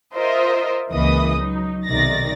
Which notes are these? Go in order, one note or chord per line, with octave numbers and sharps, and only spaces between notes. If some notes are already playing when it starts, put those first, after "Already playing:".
F4 A#4 C5 D#5 E5
C#2 E3 A#3 B4 D#5 D#6
F#3 D#4
B1 C3 D#3 D5 A6 A#6